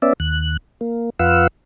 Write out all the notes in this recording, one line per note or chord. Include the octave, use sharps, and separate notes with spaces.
B3 C#4 D5 E5
D#2 F#6
A#3
F2 F4 B4 F5 F#5 E6